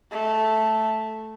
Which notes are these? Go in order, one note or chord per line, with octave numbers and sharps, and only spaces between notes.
A3